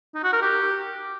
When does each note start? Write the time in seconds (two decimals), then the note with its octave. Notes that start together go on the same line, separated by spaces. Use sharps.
0.15 D#4
0.24 F#4
0.33 A#4
0.42 G4